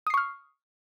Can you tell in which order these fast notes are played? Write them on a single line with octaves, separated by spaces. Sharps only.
D#6 C7 C#6 F6